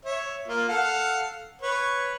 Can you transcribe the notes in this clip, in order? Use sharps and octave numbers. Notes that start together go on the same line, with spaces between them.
C#5 E5
A#3 F4
A4 F5 F#5
B4 C#5